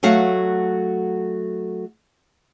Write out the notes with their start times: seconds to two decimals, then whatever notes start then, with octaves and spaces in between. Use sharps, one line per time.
0.03 F#3 A3 F#4 F5 F#5